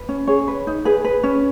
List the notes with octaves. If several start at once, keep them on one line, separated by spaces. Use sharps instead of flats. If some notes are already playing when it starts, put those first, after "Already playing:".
Already playing: B4
C#4
G#4 C#5
B4
D#4
G#4 B4
B4
C#4